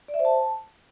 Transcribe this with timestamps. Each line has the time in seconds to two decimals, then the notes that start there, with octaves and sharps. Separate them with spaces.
0.08 D5
0.14 E5
0.19 C5
0.25 A5